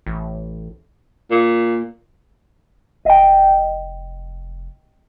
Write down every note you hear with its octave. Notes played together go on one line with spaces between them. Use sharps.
A1
A#2
F1 D#5 G5